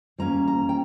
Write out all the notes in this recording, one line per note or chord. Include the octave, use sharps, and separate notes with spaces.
G3 A#3 C#4 A#5
A#5
G5